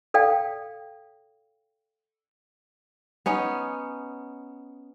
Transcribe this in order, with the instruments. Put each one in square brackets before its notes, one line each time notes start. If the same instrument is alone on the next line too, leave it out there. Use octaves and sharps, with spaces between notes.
[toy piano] A4 D5 F5 G5
[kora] B3 C#4 D#4